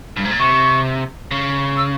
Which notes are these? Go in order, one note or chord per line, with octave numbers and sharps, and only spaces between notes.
G2
G#2
A#2
C3 C#6
C#3
E6